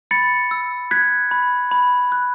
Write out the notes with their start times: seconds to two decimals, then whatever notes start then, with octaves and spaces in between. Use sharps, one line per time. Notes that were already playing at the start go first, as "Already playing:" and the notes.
0.11 B5 A6 C#7
0.51 E6
0.91 F#6 G#6 B6
1.31 B5
1.72 B5
2.12 F#6